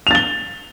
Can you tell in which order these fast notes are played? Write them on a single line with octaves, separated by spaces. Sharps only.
F7 A6 G7